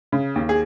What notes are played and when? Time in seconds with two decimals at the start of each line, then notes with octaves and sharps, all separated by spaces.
0.12 C#3
0.36 D#2
0.49 G#4